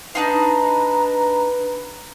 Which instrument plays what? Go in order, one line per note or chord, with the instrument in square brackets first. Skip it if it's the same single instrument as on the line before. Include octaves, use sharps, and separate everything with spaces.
[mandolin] D4 D#4 F4 [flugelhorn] B4 [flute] A#5